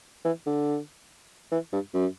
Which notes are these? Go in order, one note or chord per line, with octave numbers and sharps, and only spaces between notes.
E3
D3
E3
G2
F#2